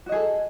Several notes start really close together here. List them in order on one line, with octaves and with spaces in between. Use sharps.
F#4 D#5 G#4 A4